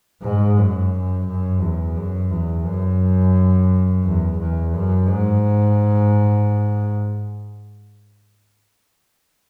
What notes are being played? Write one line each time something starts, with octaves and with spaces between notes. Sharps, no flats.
G#2
F#2
F#2
E2
F#2
E2
F#2
E2
E2
F#2
G#2